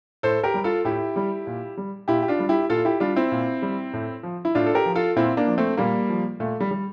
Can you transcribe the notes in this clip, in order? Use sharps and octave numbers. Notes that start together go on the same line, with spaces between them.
A2 A4 C5
G4 A#4
G3
F4 A4
A2 E4 G4
G3
A#2
G3
A#2 E4 G4
G4
D4 F4
G3
E4 G4
A#2 F4 A4
E4 G4
G3 D4 F4
C4 E4
A#2
G3
A2
F3
E4
A2 D4 F4
A4
G4 A#4
F3
F4 A4
A#2 C4 E4
A#3 D4
F3
A3 C4
A#2 G3 A#3
F3
A#2 A3
G3
G3